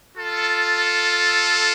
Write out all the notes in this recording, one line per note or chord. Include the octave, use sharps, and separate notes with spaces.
F4 A4